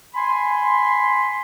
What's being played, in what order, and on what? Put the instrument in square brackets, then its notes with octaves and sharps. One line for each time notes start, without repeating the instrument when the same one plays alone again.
[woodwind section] G#5 B5 C6